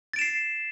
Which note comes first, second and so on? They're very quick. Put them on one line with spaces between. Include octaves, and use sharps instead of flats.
A6 D7 E7 C7